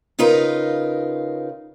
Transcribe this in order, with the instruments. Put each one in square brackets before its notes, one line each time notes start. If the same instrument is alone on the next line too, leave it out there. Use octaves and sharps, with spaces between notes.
[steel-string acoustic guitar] C#3 D#4 F4 A#4 B4